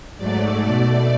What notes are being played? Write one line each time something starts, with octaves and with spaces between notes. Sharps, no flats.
G#2 F#3 A3 D5
B2 A3